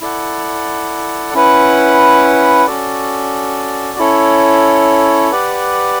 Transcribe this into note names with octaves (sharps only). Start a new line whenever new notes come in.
E4 A4 D5 F#5
C#4 E4 B4 F#5
C#4 F#4 A4 D5
C#4 E4 A4 C#5
G4 B4 D5 F#5